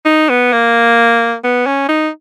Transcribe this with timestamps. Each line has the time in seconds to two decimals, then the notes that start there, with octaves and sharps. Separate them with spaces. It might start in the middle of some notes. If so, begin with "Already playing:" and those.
0.05 D#4
0.29 B3
0.52 A#3
1.44 B3
1.66 C#4
1.89 D#4